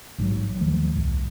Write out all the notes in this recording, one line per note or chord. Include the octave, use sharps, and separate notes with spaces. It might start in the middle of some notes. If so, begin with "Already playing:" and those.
A#1 G#2 C3 F#3
D#2 D#3 F3 A3
C2 A2